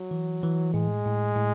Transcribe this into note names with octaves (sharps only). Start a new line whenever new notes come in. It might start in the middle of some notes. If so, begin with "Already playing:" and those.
Already playing: F#3
E3
E3
A2 G#3
A2
A2